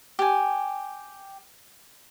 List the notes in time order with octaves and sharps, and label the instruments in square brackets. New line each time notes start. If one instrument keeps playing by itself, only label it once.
[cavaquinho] G4 G#5